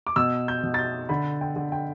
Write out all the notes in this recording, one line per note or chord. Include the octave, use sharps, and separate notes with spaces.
D6
B2 E6
G6
B2
A6
G6
D3 B5
G5
D3
G5